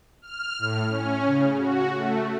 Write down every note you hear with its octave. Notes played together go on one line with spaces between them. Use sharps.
F6
A2
C#4
C#3
F#4
A3